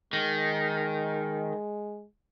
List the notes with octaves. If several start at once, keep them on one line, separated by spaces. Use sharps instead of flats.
D#3 G#3